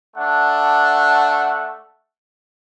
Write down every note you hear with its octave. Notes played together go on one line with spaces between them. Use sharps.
A3 D4 F#5